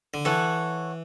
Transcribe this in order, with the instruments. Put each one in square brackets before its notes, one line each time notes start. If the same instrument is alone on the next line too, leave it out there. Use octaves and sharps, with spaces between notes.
[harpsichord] D3
[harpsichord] E3 [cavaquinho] A4 C#5 F#5